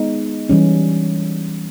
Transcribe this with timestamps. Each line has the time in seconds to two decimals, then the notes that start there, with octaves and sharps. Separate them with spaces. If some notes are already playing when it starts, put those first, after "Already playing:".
Already playing: G#3 B3 D#4 G#4
0.49 E3 G3 C#4